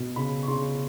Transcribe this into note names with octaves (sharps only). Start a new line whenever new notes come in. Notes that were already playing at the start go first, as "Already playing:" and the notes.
Already playing: B2
C#3 B5
C#6
C#3 C6